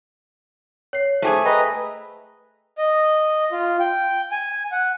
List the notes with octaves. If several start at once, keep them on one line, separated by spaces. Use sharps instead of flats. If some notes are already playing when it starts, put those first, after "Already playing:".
C#5 C7
A3 G4 G#4 C5 A5 G#6
B4 D#5 G5 A#5
D#5
F4
G5
G#5
F#5